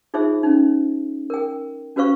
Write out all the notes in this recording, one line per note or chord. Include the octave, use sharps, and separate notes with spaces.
D#4 F4 G#4 C5 E5
C#4 D#4
A#4 G5
C#4 F#4 B4 C5 F5 C#6